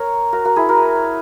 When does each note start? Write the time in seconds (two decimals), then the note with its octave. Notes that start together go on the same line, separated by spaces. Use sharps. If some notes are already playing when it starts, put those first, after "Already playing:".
Already playing: A#4 C#5
0.33 F#4 A#4
0.45 F#4 A#4
0.56 E4 G#4
0.69 F#4 A#4